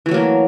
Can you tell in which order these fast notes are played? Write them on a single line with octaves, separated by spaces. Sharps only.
E3 A3 F#3 A#3